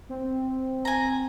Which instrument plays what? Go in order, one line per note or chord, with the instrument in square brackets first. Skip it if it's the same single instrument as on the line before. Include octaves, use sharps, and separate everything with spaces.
[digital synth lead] C4
[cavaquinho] G#5 A#5